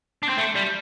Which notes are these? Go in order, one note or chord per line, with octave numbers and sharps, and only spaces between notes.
D4
C4
A3
G3